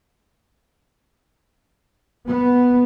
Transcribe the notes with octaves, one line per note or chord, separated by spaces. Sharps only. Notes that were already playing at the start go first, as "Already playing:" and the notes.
B3